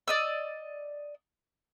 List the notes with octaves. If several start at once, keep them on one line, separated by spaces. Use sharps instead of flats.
D5 D#5 E6